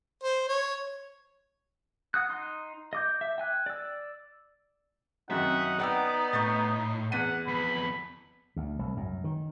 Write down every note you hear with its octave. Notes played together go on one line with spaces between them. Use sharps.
C5
C#5
F#5 D#6 F#6
D#4 C6
D#5 D6 G6
E5
G5 G#5 F#6
D5 E6
F#2 C3 D#3 D#4 E5 F#5
B3 D5 F#5 G5 E6
A2 C#6 G6 A6
E2 F#5 B6 D#7
F2 B3 B5
D2
C2
F#2
D#3